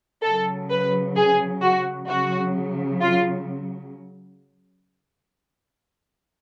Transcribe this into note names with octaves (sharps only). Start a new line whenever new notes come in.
C#3 F#3 A4
B4
G#4
F#4
C#3 F#3 F#4
F4